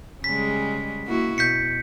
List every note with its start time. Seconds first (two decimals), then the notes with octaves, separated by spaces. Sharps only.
0.24 C#3 G3 G#3 B6
1.06 A#3 E4 F#4
1.38 B2 G6 B6 C#7